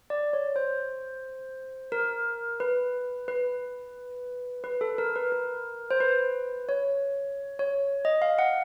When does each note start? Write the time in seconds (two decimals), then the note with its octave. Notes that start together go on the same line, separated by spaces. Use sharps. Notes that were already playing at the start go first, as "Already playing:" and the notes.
0.10 D5
0.33 C#5
0.56 C5
1.92 A#4
2.60 B4
3.28 B4
4.64 B4
4.81 A4
4.98 A#4
5.16 B4
5.32 A#4
5.91 C5
6.00 B4
6.69 C#5
7.59 C#5
8.05 D#5
8.22 F5
8.39 F#5